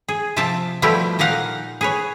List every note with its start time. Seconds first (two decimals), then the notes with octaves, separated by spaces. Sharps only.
0.08 G#4
0.36 C3 F3 E5 G5 A5
0.82 B2 F3 G3 A3 E4 G4
1.19 A#2 D#4 G4 F5 F#5
1.81 G#4 B4 C#5